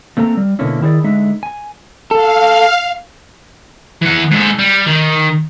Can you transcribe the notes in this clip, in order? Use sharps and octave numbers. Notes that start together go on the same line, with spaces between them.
A3 A#3 C4 A4 A#5
G3
B2 D3 A#3 C#4 E4
D#3 E4 G#4 C5 D5
D3 G#3 D#4 E5
G#5
A4 F5
E3 F#5
G#2 A4
G3
D#3